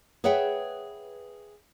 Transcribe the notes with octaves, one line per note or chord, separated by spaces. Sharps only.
G#4 B4 C#5 E5 F#5 G5